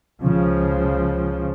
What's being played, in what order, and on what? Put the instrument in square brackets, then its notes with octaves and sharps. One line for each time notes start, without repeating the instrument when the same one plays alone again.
[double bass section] C#2 C#3 F3